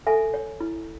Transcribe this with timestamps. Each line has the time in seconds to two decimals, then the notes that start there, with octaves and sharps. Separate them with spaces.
0.07 A4 E5 G#5
0.34 C#5
0.60 E4